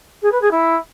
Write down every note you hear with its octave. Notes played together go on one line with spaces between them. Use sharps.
G#4
B4
G#4
E4